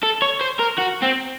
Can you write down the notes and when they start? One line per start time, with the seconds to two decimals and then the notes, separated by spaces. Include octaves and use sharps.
0.03 A4
0.22 C#5
0.41 C5
0.59 A#4
0.78 F#4
1.02 C4